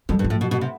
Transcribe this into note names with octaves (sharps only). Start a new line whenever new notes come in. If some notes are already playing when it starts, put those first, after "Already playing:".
F2 G3
G2
F3
A2
B2
B2
C3